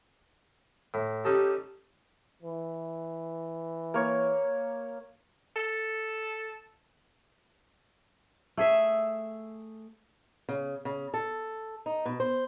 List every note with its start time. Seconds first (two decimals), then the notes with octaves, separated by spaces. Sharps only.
0.94 A2
1.25 C#4 D#4 G4 A4
2.43 E3
3.94 A#3 C#5
5.56 A4
8.57 A3 G#4 E5
10.49 C#3
10.85 C#3
11.14 A4
11.86 D#4
12.06 B2
12.20 C5